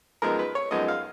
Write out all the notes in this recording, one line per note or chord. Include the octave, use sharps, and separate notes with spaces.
F#2 F3 G#3 B3 D#4 A#4
B4
C#5
F#2 F3 G#3 B3 D#4 D#5
F5